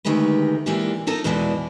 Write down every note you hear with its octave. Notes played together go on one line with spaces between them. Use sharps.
D2 D#3 G#3 A3 G4 B4
E3 G#3 A#3 D4 F4 G4
D#4 F4 A4 A#4
E2 B2 E3 G#3 G4 D5